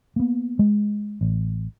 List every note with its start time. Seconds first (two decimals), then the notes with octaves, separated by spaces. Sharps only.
0.16 A#3 B3
0.59 G#3
1.21 A1